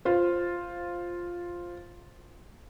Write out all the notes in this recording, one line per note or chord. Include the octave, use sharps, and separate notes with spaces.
F4 C5